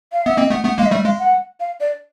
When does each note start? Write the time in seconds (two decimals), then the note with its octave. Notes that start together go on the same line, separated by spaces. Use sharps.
0.13 F5
0.25 B3 E5
0.37 A#3 C4 D#5
0.50 A3 B3
0.64 A3 B3
0.78 G#3 A#3 F5
0.86 D#5
0.91 G3 A3 E5
1.05 G#3 F5
1.19 F#5
1.60 F5
1.80 D5